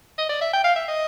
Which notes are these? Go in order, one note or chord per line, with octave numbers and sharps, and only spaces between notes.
D#5
D5
E5
G5
F5
E5
D#5